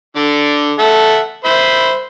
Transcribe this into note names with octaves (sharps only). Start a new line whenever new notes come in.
D3 D5
A4 E5 F#5
C5 E5 B5